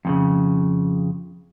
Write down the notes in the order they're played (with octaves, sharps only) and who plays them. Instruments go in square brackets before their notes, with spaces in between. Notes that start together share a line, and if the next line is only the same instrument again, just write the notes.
[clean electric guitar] F2 A2 C#3